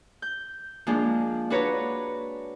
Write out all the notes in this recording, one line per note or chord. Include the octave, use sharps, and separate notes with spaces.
G6
F3 G#3 A#3 D4
D4 F#4 B4 C#5 A#5